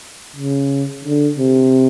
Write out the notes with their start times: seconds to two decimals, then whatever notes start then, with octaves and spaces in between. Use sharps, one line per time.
0.36 C#3
1.05 D3
1.38 C3